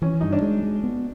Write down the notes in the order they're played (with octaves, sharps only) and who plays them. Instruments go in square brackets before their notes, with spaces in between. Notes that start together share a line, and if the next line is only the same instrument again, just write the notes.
[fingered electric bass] E3 [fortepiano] C#4
[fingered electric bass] G2 [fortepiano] D#4
[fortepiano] D4
[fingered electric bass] G#3
G#3
B3